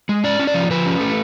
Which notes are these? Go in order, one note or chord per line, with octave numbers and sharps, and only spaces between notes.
G#3
C#4 D5
C#4
D5
F3
F3 B4
C#4
A3